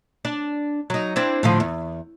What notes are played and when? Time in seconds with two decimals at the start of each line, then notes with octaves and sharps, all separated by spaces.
0.25 D4
0.90 F#3 D#4
1.16 C4 D4 E4
1.43 A2 D3 F3
1.60 E2